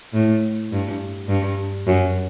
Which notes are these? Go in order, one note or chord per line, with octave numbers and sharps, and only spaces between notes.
A2
G2
G2
F#2